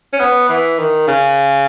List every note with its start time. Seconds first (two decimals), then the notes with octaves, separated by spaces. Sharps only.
0.13 C#4
0.20 B3
0.49 E3
0.78 D#3
1.07 C#3